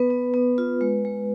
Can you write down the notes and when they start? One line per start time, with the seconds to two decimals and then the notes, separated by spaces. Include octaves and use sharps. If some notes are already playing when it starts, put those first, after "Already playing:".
Already playing: B3 B4
0.10 B3
0.34 B3
0.58 F4
0.81 G#3
1.05 G#3